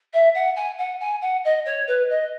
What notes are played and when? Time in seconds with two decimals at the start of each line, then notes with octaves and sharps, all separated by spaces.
0.13 E5
0.34 F#5
0.56 G#5
0.78 F#5
1.00 G#5
1.21 F#5
1.44 D#5
1.65 C#5
1.87 B4
2.09 D#5